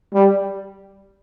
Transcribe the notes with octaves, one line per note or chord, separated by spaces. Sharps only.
G3